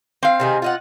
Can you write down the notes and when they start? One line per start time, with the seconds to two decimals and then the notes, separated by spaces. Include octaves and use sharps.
0.23 C4 F5
0.40 C3 D#3 G#4
0.62 F4 D#5 F#5